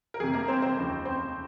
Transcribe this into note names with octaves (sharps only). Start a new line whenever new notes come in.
A#4
G1 F2 C3 G#4
A#3 A#4
C4 C5
C4 C5
F1 D#2 C#3 F3
C4 C5